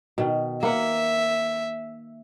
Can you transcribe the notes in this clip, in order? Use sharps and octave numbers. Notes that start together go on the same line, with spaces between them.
B2 D#3
A#3 B4 E5 F#5